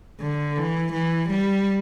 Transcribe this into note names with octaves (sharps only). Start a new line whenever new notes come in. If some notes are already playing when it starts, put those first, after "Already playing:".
D3
E3
E3
G3